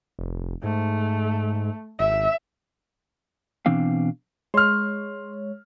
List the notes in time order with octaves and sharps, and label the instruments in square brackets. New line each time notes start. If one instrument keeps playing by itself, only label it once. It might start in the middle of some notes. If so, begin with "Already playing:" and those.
[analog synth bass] F1
[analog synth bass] G#2 [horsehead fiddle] A3
[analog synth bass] G#1 [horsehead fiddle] E5
[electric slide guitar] B2 E3 C4 D4 F5
[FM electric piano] G#3 C#5 [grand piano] C6 F6